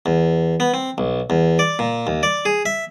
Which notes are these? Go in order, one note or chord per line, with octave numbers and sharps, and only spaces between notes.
E2
B3
C4
B1
E2
D5
A#2
D#2
D5
G#4
E5